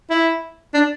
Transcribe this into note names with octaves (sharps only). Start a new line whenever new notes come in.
E4
D4